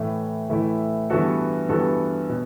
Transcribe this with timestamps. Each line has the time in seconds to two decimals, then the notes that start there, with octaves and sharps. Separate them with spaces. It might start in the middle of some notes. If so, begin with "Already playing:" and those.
Already playing: A2 E3 A3 E4
0.49 A2 E3 A3 E4
1.10 G2 E3 B3 F#4 A4
1.69 G2 E3 B3 F#4 A4
2.29 B2